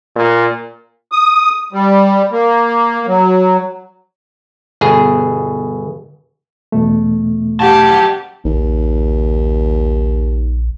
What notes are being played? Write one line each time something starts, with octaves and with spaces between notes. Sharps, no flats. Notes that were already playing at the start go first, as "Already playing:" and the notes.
A#2
D#6
G3
A#3
F#3
G1 B2 G#4
E2 B2 A3
F#2 G4 F#5 A5
A#1 D#2